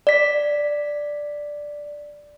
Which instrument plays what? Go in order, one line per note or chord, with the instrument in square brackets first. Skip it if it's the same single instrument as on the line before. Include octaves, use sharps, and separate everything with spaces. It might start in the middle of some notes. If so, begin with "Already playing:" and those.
[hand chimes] D5 B6